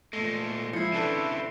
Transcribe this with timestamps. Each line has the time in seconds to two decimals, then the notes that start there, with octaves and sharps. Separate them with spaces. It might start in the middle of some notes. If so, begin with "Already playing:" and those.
0.13 A#2 G#3 A3 A#6
0.73 F3 G#3 E4 C7 C#7
0.92 C#3 C4 D4 A4 B4 D7 E7